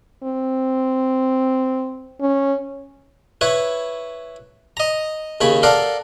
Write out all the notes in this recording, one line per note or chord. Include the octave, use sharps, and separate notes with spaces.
C4
C#4
E4 B4 C#5
D#5 A#5
D#2 C#3 C#5 B5
A4 A#4 D5 F5 F#5